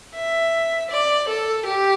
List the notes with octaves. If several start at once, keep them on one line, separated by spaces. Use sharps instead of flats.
E5
D5
A4
G4